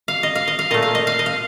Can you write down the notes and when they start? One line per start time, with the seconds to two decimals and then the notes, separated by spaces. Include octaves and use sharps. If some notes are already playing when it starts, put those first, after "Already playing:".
0.08 F5
0.23 D#5
0.35 F5
0.48 D#5
0.59 F5
0.71 A#2 A3 D#5
0.82 F5
0.95 D#5
1.07 F5
1.19 D#5
1.26 F5